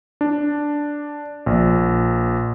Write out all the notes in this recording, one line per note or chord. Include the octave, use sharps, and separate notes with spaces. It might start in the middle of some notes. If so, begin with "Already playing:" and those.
D4
A#1